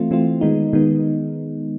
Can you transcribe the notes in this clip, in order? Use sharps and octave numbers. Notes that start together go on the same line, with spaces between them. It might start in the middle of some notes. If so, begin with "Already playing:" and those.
Already playing: E3 A3 C4 F4
E3 A3 C4 F4
D#3 G#3 B3 D#4
D#3 G#3 B3 D#4